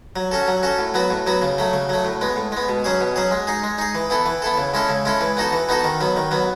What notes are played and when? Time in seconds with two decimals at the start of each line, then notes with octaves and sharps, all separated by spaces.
0.16 F#3
0.31 C#4 F#4 A4
0.48 F#3
0.63 C#4 F#4 A4
0.79 A2
0.94 F#3 B3 F#4
1.11 A2
1.27 F#3 B3 F#4
1.42 C#3
1.58 F#3 A3
1.73 C#3
1.89 F#3 A3
2.05 A2
2.21 G#3 B3
2.36 A2
2.52 G#3 B3
2.68 B2
2.84 F#3 C#4 G#4
3.00 B2
3.16 F#3 C#4 G#4
3.31 G#3
3.47 D#4 G#4
3.64 G#3
3.78 D#4 G#4
3.95 E3
4.10 B3 E4 A4
4.26 E3
4.42 B3 E4 A4
4.57 C#3
4.74 G#3 C#4 E4 A4
4.89 C#3
5.05 G#3 C#4 E4 A4
5.21 E3
5.37 B3 D#4 F#4 A4
5.53 E3
5.69 B3 D#4 F#4 A4
5.84 D#3
6.01 F#3 B3
6.16 D#3
6.31 F#3 B3